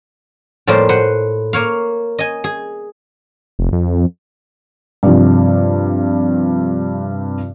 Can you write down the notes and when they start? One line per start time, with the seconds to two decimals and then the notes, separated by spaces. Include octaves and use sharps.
0.67 A2 F3 G3 A#3 C5
0.89 B4 C5 F#5 C6
1.53 A#3 C#5 F5
2.19 D#5 G#5
2.44 G#4
3.59 F1
3.73 F2
5.03 G2 C3 F3